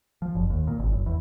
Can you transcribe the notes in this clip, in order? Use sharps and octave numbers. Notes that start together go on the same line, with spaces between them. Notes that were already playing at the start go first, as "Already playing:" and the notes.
F3
F#1
D#2
A#2
G#1
F#1
E2